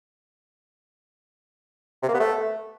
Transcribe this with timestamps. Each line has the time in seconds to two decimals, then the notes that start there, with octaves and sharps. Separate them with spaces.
2.03 C3
2.08 A#3
2.14 B3
2.20 A3